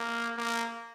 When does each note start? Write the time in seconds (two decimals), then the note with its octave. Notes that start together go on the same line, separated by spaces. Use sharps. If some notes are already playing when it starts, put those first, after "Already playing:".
Already playing: A#3
0.37 A#3